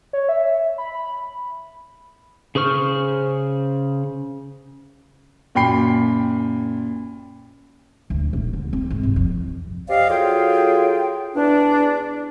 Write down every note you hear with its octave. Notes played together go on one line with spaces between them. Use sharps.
C#5
E5
B5
C#3 G#4 C5 C#6 F6
F#2 A#2 G5 B5 C7
D2
D#1
D2
C4
G#1
C2
F2
C4 G4 D5 D#5 F5
F#3 F4 G#4 A4 G5
E2 D4